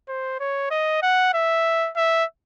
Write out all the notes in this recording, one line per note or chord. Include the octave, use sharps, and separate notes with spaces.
C5
C#5
D#5
F#5
E5
E5